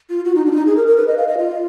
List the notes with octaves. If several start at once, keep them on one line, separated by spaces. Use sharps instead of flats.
F4
F#4
D#4
D4
F4
D#4
G#4
A#4
A#4
B4
D#5
F5
D#5
F4